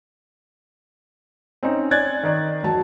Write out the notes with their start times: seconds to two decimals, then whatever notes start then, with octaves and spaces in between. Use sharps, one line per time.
1.63 C4 C#4 D#4
1.91 C#5 D5 G#5 F#6 G#6 A6
2.23 D#3 D#4 D5 D#5
2.62 E1 F#3 A5